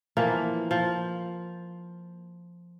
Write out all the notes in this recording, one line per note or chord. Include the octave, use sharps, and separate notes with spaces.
E3 F3 A#3
F3